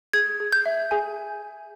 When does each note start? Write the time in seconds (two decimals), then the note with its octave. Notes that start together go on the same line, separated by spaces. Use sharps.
0.13 G#4 G#6
0.40 G#4
0.52 G6
0.66 E5
0.91 G#4 G#5